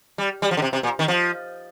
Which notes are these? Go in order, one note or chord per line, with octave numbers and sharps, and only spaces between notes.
G3
G3
F3
D3
C3
C3
A#2
D#3
F3